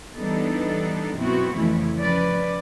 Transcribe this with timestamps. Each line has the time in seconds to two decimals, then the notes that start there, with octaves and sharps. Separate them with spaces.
0.18 E3 G3 B3 D4 D#4 A4
1.18 F#2 B2 B3 C4 E4 F#4
1.56 F2 C#3 E3 A3 C#4 E4
1.97 F3 C#4 B4 D5